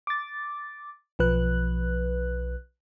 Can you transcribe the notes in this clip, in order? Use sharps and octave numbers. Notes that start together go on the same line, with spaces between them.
D6 A6
B1 F3 B4 F#6